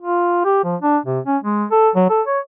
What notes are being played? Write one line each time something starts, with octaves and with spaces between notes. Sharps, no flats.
F4
G4
F3
D4
C3
C#4
G#3
A4
F#3
A4
C#5